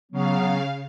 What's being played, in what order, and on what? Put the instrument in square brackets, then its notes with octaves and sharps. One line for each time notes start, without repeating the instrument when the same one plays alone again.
[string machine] C#3 F5 [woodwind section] F#3 B3